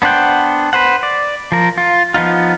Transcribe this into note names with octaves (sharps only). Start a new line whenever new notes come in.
B3 D4 C5 F#5 G5
B4 C5 F#5
D5
F3 A#4
F4
F3 B3 D#4 F4